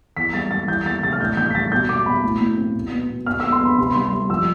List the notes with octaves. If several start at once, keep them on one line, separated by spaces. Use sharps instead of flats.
E2 B6
G3 A6
G3 A6
E3 G6
E2 A6
C3 A6
F6
A2 G6
E3 G6
B6
G3 A6
B2 G6
B2 D6
B2 B5
A2
A2
C4
B2
B3
B2
B3 F6
E6
B3
C6
B3 B5
C3 C6
B5
G3 C6
C6
G3
F3 E6